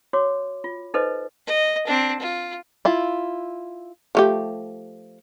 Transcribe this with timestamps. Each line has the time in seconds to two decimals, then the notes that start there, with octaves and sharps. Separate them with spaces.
0.13 F#4 C#5 D6
0.64 F4
0.94 D#4 A4 B4 C5 D#5
1.47 D#5
1.87 C4 D4
2.20 F4
2.85 E4 F4
4.15 F3 A3 G4